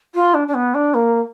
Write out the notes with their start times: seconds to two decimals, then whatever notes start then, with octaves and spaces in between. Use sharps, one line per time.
0.14 F4
0.34 D4
0.47 D4
0.54 B3
0.74 D4
0.94 A#3